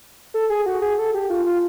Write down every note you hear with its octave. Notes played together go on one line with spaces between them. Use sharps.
A4
G#4
F#4
G#4
A4
G4
F4
F4